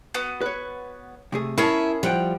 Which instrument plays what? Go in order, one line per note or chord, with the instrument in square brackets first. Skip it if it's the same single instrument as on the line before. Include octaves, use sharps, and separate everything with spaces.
[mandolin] B3 F#4
[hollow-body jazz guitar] B4 C#5
C3 A3 G#4
[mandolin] C#4 G#4 C#6 [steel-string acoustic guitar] E4 [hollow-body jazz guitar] A#4 E5 A5
[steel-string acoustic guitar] F3 [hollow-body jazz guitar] G3 F#5 G5